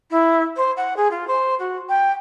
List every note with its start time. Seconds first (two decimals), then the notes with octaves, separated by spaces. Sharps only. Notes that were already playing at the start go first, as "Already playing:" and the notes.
0.11 E4
0.56 C5
0.77 F#5
0.96 G#4
1.11 F4
1.27 C5
1.59 F#4
1.89 G5